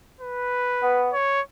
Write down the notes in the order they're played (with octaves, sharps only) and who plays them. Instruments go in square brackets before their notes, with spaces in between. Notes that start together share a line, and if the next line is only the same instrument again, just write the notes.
[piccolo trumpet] B4
[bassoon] B3
[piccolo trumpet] C#5